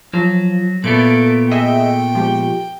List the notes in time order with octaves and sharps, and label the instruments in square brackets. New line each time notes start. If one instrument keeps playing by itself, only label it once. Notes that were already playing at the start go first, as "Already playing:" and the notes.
[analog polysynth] F3 [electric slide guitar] F#3
[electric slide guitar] A#2 A3 B3 [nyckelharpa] A4 [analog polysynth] D7
[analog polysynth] G#4 D#5 E5 [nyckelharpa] G5
[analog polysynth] F3 G#3 G4